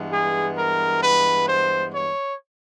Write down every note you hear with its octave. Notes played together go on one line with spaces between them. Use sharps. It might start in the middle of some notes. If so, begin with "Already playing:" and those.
Already playing: G2 E3 G#3 B3
G#4
A#4
B4
C5
C#5